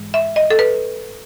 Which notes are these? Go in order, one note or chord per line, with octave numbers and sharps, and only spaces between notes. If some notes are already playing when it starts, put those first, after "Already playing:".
Already playing: G#2 E3 G#3
E5
D#5
A4
B4